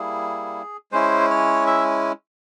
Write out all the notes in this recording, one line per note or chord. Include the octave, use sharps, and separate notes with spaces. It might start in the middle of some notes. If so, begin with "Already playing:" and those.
Already playing: G3 A#3 E4 G#4
G#3 C#4 E4 C5
C#5
E5